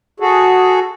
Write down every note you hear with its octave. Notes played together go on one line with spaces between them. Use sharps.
F#4 G#4 A4